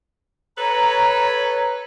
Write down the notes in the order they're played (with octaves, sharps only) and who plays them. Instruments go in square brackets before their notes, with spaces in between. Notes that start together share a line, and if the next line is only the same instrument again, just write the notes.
[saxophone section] A4 B4 [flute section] C#5 A#5